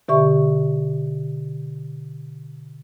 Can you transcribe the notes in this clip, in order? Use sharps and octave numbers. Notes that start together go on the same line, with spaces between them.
B2 D3 G4 E5 C#6